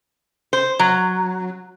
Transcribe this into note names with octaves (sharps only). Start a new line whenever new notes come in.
C5
F#3